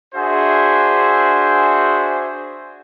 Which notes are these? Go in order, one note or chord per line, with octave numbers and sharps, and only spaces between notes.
D4 F#4 G#4 C5 E5